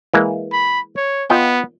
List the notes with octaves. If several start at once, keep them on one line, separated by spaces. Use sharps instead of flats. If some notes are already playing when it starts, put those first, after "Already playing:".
E3 G#3 A#3
B5
C#5
B3 F4 D#5 G5